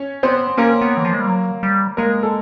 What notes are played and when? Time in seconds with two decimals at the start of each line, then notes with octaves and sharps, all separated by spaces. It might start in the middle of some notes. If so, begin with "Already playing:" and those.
Already playing: C#4 C#5
0.23 B3 C4 C5
0.57 A#3 C#4 A#4
0.81 B3
0.97 E3
1.05 F3
1.13 G#3
1.21 G3
1.27 F#3
1.63 G3
1.97 G#3 A#3 A#4
2.23 A4